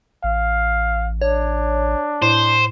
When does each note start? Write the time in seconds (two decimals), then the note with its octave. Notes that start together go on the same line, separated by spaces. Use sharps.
0.24 A1 F5
1.22 D4 C#5
2.22 A2 C5